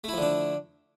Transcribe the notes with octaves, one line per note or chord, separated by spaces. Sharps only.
D3 F3 A3 D4 E4